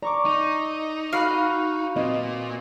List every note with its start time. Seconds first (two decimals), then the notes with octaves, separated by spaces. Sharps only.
0.02 D5 A#5 C#6 D6
0.25 D#4
1.13 F#4 F5 B5 F#6
1.96 A#2 C4 B4 D#5